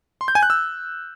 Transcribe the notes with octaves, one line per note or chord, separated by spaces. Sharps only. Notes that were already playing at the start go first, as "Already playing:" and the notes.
C6
G6
G#5
F#6
E6